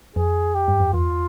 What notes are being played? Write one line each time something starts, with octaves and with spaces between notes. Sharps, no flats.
F2 G#4
G4
G2
F2
E2 F4